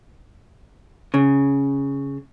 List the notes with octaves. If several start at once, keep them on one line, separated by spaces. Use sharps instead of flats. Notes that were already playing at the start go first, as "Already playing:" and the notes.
C#3